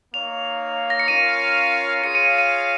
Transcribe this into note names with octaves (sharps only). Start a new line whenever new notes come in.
A#3 D#4 C#5 F5 F7
A#6
C#7
C#4 F4 A#4 C#5 F5 D#7
F4 G#4 C#5 F5 C#7
D#7
D#7